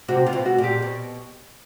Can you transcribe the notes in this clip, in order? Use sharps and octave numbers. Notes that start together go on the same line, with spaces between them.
C3 F#4
C3 F4
B2
F#4
A#2
G4
B2